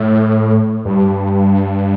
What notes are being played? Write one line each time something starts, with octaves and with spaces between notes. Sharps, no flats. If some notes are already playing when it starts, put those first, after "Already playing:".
Already playing: A2
G2